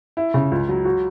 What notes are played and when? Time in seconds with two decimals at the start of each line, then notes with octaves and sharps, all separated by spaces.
0.17 E4
0.34 C#3
0.51 C#2
0.69 F#3
0.85 F#4